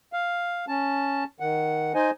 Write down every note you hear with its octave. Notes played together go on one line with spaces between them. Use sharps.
F5
C#4 A5
D#3 F#5
D#4 C5 D#5 G#5